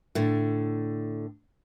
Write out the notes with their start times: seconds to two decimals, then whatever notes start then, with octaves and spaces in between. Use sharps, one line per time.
0.15 A2 D3